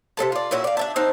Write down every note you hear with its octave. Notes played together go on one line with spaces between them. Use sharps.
C3 C4 A4 A5
F4 D5
A#2 C#4 E4 F#4
D5 F5
D4 E5 A5
C4 D4 D#4